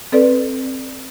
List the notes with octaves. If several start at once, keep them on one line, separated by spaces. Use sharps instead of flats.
C4 A4 B4 D5